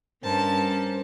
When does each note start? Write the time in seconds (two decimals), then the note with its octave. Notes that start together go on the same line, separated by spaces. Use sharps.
0.24 G2 C#4 A#4 C5 A5